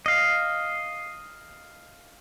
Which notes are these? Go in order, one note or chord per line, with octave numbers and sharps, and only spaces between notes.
D#5 F5